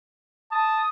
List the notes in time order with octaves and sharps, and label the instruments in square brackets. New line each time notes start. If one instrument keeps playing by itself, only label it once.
[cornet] A5 [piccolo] D#6